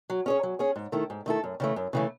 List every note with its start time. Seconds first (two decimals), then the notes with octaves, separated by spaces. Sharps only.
0.10 F#3
0.26 C#4 G#4 C#5
0.43 F#3
0.59 C#4 G#4 C#5
0.76 G#2
0.92 D#3 A3 E4 A4
1.10 G#2
1.26 D#3 A3 E4 A4
1.44 F#2
1.60 C#3 E3 A3
1.76 F#2
1.93 C#3 E3 A3